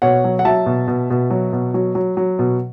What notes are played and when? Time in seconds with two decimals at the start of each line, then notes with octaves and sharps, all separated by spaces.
0.02 B2 C#5 F#5
0.24 F#3
0.39 F#5
0.45 F#3 E5 A5
0.66 B2
0.88 B2
1.10 B2
1.31 F#3
1.53 B2
1.74 F#3
1.95 F#3
2.17 F#3
2.39 B2